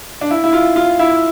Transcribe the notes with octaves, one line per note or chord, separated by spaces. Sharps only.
D4
E4
E4
F4
F4
E4